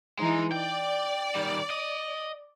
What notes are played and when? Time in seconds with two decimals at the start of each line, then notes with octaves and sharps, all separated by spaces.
0.19 E3 G#3 D#4
0.52 D5 G5
1.35 D#3 G3
1.70 D#5